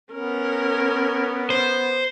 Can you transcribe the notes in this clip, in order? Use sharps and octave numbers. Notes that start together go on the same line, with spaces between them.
B3 C#4 A#4
C5